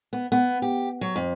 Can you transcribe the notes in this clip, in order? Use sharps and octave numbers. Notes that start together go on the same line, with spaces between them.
B3
B3
G4
F#3
F2